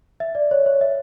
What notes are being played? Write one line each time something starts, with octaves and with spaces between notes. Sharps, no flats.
E5
D5
C#5
C#5
E5